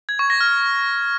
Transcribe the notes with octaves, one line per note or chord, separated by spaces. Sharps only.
G#6
C#6
A#6
F6